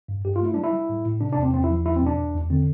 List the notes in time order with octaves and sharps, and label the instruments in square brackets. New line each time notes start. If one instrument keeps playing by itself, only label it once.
[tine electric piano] G2
G2 G4
F4
A3
E4
G3 D4
E4
G3
A2
A2
C3 D4
D4
E2 C4
E2 C4
E4
F3
E2 E4
C4
B2 D4
E2
E2
D3 C4